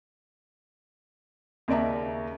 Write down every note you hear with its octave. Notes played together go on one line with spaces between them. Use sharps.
D#2 C#3 D5 E5 A#5